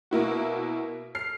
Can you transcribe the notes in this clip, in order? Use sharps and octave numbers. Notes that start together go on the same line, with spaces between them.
B2 A#3 E4 F#4
F6 C7